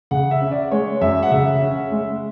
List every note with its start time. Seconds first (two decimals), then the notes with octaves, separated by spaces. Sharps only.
0.11 C#3 F#5
0.31 E5
0.41 C#4
0.51 D5
0.71 G#3 C#5
1.01 F#2 E5
1.23 F#5
1.31 C#3 E5
1.61 C#4
1.92 G#3